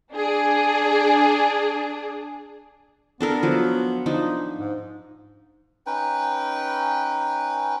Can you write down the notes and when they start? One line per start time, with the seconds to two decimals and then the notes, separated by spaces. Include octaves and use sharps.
0.14 D4 G#4
3.21 B3 D4 A4 A#4
3.43 F3 F#3
4.06 F3 D4 D#4
4.56 G#2
5.86 C#4 D#4 B4 G5